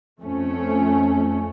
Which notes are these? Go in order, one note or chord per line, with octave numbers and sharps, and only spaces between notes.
F2 A3 C#4